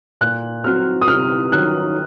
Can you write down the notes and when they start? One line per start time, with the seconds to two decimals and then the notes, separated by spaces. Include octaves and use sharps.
0.21 A#2 F#6
0.64 F#3 C4 F#4 F6
1.01 D#6
1.08 C3 F6
1.52 D#3 F#3 C#4 F#6